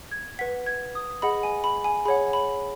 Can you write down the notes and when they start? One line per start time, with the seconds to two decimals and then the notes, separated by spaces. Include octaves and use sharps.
0.11 G#6
0.39 B4 F#5 B6
0.66 G#6
0.95 D#6
1.22 G#4 D#5 F#5 B5
1.43 G#5
1.64 B5
1.84 G#5
2.06 G#4 C#5 F#5 B5
2.33 B5